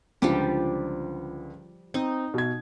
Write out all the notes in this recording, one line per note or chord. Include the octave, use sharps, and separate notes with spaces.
C#2 D3 F3 G3 G4
C4 D#4
B2 G#6